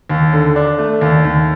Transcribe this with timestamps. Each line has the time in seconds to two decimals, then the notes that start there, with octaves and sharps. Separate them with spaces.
0.10 D#2
0.33 D3
0.56 D4
0.79 A3
1.01 D#2
1.25 D#2